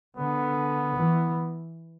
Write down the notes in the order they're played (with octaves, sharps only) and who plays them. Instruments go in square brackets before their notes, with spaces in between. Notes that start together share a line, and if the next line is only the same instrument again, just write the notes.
[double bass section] D3 [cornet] B3
[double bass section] E3